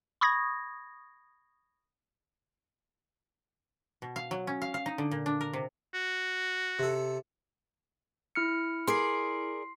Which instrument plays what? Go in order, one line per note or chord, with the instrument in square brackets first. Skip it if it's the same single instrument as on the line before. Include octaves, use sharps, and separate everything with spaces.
[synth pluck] B5 C#6 D#6 G#6 A#6
[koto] B2
F5
F#3
C#4
F5
F5
D#4
D3
A#2
D4
A#4
C3
[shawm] F#4
[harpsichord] C3 A4
[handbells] E4 F6 C#7
[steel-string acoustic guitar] G#4 A#4 D5 [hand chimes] C6 C7